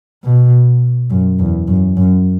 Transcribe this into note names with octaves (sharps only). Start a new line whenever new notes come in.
B2
F#2
E2
F#2
F#2